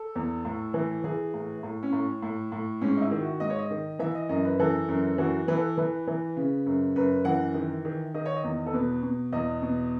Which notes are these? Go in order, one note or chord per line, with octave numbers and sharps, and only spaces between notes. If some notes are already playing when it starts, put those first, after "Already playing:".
Already playing: A4
E2
A2
E3
E3 G#4
A2
A2
C#4
A2
A2
A2
G#2 C#4
D#4
E4
D#3
F#4
G#2 D#5
C#5
D#5
D#3
E3 E5
D#5
F#2 D#5
B4
E3 A4
F#2
E3 F#4
E3 B4
A4
E3 B4
E3
C#3
F#2
F#2 B4
E3 F#5
D#3
D#3
D#3 D#5
C#5
D#5
E2
A4
B2 B4
B2
E2 D#5
B2